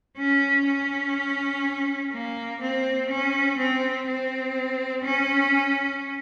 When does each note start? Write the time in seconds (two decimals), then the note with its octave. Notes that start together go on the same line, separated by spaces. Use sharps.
0.18 C#4
0.66 C#4
2.13 A#3
2.61 C4
3.09 C#4
3.59 C4
4.07 C4
5.04 C#4